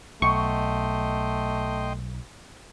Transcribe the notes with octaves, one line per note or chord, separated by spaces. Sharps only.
B1 A3 D#5 G5 C6 C#6